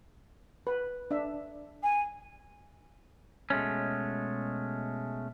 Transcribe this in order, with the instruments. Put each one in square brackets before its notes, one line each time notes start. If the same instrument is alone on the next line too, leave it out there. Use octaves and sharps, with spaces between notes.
[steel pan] B4
D4 E5
[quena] G#5
[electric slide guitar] B2 G#3 A3 C#4